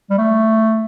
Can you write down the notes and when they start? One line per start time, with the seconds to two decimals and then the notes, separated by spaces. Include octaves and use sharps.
0.10 G3
0.18 A3